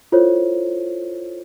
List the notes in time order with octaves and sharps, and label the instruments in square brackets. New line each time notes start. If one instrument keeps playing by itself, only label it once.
[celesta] E4 F4 A4 C5 C#5